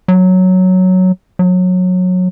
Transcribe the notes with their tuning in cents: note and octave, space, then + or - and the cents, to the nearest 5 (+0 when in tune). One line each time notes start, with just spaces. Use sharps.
F#3 +0
F#3 -20